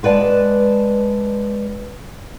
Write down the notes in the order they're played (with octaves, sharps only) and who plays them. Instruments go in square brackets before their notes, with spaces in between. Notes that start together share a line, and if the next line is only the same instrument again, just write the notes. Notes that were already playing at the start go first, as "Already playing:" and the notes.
[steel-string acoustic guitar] G#3 B4 D5 F#5 A5